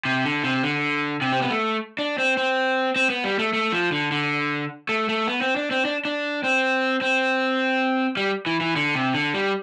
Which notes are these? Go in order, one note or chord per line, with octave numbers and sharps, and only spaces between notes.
C3
D3
C3
D3
C3
C4
B3
A3
D4
C4
C4
C4
B3
G3
A3
A3
F3
D3
D3
A3
A3
B3
C4
D4
C4
D4
D4
C4
C4
G3
E3
E3
D3
C3
D3
G3